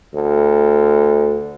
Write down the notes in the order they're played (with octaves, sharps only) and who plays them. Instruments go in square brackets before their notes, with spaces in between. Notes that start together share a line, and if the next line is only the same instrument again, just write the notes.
[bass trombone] D2